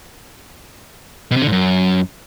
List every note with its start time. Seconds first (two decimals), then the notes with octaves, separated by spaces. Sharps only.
1.31 B2
1.37 C3
1.42 D3
1.47 G#2
1.52 F#2